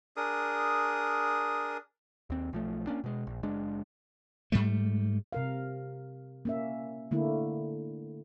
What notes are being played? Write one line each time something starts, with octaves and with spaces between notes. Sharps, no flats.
D4 G#4 A#4 D#6
D#2 C4
B1 F3 A3
A#3 C#4 D4
B2 G#3
A#1
F#1 G#3 D4
G#2 G3 A3
C3 A#4 F5
A#3 C#4 E5
D3 A3 A#3 E4